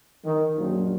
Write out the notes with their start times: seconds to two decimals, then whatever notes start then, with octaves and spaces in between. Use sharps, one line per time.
0.25 D#3
0.57 A#1 F#2 A#2 F3 F#3